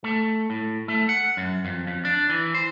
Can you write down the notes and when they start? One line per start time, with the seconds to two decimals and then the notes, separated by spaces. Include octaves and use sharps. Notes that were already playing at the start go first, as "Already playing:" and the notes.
0.04 A3
0.50 A2
0.88 A3
1.09 F#5
1.37 F#2
1.65 F2
1.87 F2
2.05 D4
2.30 E3
2.54 C5